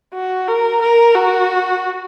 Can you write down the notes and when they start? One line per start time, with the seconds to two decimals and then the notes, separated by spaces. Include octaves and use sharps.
0.14 F#4
0.48 A#4
0.82 A#4
1.15 F#4